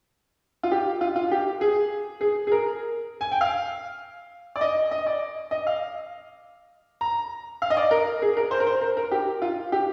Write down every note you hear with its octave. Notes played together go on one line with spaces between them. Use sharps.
F4
G4
F4
F4
G4
G#4
G#4
G#4
A#4
G#5
G5
F5
D5
D#5
D#5
D5
D#5
F5
A#5
F5
D#5
D5
A#4
G#4
A#4
C5
A#4
C5
A#4
A#4
G4
F4
G4